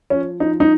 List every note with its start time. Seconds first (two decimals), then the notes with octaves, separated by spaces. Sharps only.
0.10 F3 C#4
0.40 F3 D#4
0.60 D#4